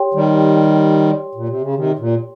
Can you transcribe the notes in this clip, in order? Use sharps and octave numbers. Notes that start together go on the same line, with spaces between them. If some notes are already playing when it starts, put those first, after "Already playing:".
Already playing: G4 C#5 G5 C6
D#3 G3
A#2
C3
C#3
C3 D#3
A#2